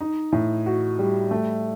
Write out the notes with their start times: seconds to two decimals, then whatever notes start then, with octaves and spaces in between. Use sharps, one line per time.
0.01 D#4
0.32 A2
0.66 F#4
0.99 G3
1.31 A3